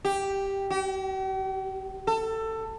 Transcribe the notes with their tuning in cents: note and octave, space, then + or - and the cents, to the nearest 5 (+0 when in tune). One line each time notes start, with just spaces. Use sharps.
G4 +0
G4 -45
A4 +20